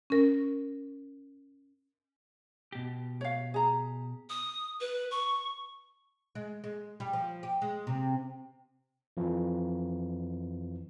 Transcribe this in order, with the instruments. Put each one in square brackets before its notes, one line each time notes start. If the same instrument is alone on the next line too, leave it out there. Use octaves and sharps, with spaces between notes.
[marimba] C#4 A#4
[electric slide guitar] B2 G4
[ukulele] C#5 F5
G#4 A#5
[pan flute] D#6
B4
C#6
[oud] G#3
G#3
G3
F3
G4
G#3
C3
[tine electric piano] F2 E3 F3